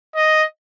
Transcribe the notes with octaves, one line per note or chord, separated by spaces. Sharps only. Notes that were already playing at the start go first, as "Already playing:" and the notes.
D#5